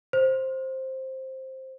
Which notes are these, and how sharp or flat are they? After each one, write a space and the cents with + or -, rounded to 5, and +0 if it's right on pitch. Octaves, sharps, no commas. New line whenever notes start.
C5 +10